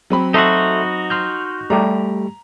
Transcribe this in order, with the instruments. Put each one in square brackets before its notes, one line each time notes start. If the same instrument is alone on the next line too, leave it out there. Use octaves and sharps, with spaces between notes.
[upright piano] F#3 C4 B5
[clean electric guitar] D#4 F#4 [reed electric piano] A4 E5 C6
[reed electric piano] C6 F6 G6
[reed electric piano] G3 A3 G4 [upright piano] A#5